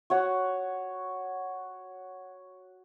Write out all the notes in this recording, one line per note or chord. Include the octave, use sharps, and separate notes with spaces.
F#4 C#5 F#5